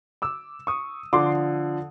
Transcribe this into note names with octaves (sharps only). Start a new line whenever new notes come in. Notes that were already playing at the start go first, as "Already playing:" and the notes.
D6 E6
C#6 D#6
D3 F3 C6 D6